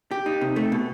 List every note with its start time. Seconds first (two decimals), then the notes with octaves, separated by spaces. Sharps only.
0.11 G4
0.26 D#4
0.41 C3
0.56 A3
0.72 B2